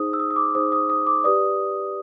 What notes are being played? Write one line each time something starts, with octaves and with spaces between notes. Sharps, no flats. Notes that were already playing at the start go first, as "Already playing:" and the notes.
Already playing: D#4 G#4 C5 D#6
E6
D#6
D#6
D6
D#4 G#4 C5 D#6
D#6
D#6
D6
G4 B4 D5 D#6